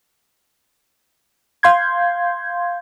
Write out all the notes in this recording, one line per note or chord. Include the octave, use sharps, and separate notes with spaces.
F5 C6 G6 G#6